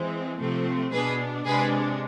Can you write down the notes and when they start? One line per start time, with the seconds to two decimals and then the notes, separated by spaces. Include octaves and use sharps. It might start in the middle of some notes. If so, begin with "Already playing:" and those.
Already playing: E3 G#3 C4
0.38 C3 F3 A3 C4
0.92 B2 B3 D4 G#4 B4
1.45 C3 G#3 D4 G#4 B4